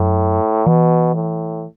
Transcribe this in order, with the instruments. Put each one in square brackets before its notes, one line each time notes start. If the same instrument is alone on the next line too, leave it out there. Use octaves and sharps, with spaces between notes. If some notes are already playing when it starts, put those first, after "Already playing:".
Already playing: [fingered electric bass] F#2 [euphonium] A2
[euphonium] B2 [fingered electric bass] E3
[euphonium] A2